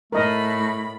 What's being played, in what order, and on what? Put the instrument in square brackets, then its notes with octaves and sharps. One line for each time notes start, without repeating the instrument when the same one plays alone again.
[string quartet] A2 B5 [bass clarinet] A3 [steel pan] A#4 D#5